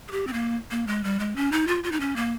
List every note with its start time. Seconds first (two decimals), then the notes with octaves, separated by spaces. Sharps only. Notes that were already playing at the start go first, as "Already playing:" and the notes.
0.08 G#4
0.12 G4
0.27 C4
0.33 A#3
0.71 A#3
0.87 G#3
1.04 G3
1.19 G#3
1.36 C#4
1.52 D#4
1.67 F4
1.84 F4
1.92 D#4
2.00 C#4
2.16 A#3